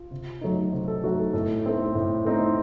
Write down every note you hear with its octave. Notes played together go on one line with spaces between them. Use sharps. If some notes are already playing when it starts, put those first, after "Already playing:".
Already playing: F4
C3
F#3 A3 D#4
C3
A4
F#3 A3 D#4 F#4
A4
A2 A4
A3 C4 D#4
A2
A3 C4 D#4